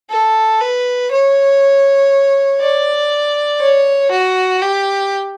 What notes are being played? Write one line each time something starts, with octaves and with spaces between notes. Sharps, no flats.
A4
B4
C#5
D5
C#5
F#4
G4